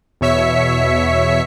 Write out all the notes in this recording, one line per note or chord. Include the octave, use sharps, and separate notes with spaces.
E2 B2 C#5 E5 B6 C#7